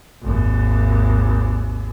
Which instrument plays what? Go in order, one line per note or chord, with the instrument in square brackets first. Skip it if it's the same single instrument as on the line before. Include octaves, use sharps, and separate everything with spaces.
[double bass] G#1 D#2